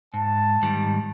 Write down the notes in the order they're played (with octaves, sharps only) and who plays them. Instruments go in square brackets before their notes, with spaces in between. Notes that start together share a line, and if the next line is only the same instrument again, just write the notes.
[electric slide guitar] G#2 [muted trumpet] A5
[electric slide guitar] G#2 D#3 G3